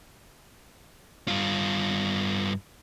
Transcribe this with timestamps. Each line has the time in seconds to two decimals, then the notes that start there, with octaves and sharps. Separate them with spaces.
1.28 G2 F4